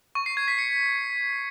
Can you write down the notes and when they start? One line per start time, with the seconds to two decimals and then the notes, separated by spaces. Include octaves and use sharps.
0.15 C#6
0.26 C7
0.37 G#6
0.48 B6
0.58 C#7